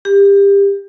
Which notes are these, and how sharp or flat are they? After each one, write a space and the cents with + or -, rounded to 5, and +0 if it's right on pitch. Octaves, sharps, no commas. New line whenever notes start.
G4 +25